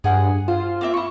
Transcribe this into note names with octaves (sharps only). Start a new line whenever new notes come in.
G2 G#4 F#5 G#5
F4 C5
A#3 C4 E5
E4 C#6